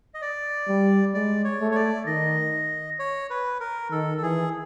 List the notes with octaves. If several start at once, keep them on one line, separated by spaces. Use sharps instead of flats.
D#5
D5
G3
G#3 D5
C#5
A3
C#5
D5
D#3 D#5
C#5
B4
A#4
D#3 A4
A4
E3 G#4